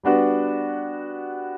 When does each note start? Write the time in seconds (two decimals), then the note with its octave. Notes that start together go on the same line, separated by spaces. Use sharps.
0.03 G3 B3 D4 F#4 B4